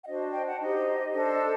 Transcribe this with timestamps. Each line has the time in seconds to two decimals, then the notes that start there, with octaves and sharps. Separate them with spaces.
0.03 F#5
0.06 D4 F#4 C5 D#5
0.20 D#5
0.33 D#5 G5
0.47 F#5 A5
0.60 D#4 G4 C5 D#5
1.13 D4 A4 C5